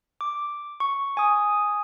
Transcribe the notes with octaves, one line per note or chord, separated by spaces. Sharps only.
D6
C#6
G#5 D#6